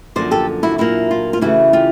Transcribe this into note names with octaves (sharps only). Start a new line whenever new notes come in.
F#2 D3 F3 A#3 C5 D5
G4 A4
E4 F#4
A#2 F#3 A#3 D4 E4
F4
F4
C#3 E3 A3 E4 F#4
F4 G4